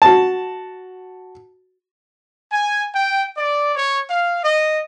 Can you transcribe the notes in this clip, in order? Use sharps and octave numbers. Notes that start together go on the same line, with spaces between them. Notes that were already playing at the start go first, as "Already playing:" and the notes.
F#4 A5
G#5
G5
D5
C#5
F5
D#5